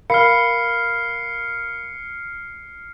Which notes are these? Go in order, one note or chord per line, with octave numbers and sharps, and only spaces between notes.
A#4 F5 B5 F6 C7 C#7